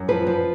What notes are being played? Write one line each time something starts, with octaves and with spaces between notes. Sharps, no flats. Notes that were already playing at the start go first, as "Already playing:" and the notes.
Already playing: F#2
F3 B4
F3